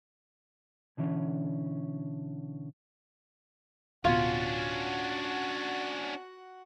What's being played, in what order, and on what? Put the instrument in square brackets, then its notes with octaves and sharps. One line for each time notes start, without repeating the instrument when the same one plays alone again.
[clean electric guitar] B2 D3 E3 C#4
[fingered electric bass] D1 B2 [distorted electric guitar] C#4 D4 [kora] F4 [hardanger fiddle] F#4 F#5